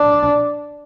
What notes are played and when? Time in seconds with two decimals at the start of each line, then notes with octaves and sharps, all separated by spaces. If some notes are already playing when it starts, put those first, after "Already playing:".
Already playing: D4